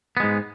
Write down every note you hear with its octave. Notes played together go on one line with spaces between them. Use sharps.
G#2 G#3 B3